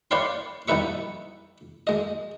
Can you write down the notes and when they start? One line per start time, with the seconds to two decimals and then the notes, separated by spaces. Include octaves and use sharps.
0.11 B4 C#5 D5 F5 G5 C6
0.68 E2 G3 D#4 B4 E5 C#6
1.87 G#3 D#5